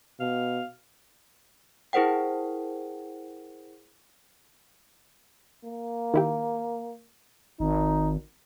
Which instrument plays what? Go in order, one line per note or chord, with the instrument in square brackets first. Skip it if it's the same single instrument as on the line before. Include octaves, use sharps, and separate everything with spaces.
[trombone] B2 [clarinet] F5
[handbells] E4 G#4 A#4 C5 F#5 G5
[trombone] A#3
[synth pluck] D#3 E4 G4
[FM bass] G#1 [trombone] D#4